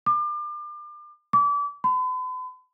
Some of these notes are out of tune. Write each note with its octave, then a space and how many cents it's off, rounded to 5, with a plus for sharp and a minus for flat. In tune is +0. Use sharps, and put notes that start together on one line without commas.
D6 +35
D6 -30
B5 +45